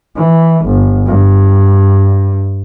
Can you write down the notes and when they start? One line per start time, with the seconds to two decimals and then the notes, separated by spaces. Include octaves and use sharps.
0.17 E3
0.66 G1
1.06 G2